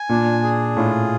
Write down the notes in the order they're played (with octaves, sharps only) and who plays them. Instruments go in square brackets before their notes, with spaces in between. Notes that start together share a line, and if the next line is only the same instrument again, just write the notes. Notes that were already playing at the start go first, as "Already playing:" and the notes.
Already playing: [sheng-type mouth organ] G#5
[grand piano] A#2 [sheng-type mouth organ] D4
[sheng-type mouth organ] G#4
[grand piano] A2 [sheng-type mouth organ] F4